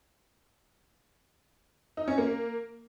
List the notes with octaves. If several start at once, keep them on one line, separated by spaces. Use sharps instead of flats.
D#4
C#4
A#3